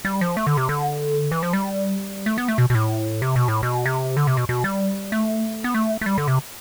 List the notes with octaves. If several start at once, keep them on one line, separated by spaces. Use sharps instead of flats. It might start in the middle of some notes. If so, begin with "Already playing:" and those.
G3
F3
A3
D3
C3
D3
E3
F3
G3
A3
B3
A3
B2
B2
A2
C3
B2
A2
B2
C3
D3
C3
B2
B2
G3
A3
B3
A3
A3
G3
D3
C3